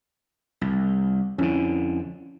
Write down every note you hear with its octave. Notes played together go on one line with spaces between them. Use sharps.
C2
F2 D3 C#4 E4